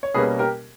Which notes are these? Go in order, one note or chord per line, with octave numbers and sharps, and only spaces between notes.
C#5
B2 G3 A#3 C#4 G#4 B4
G4 A#4